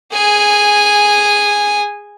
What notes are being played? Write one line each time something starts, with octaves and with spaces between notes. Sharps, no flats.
G#4 G#5